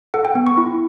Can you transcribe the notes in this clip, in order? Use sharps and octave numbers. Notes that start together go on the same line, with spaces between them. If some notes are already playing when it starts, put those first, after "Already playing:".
A4 F#5
G5
B3
C#6
E4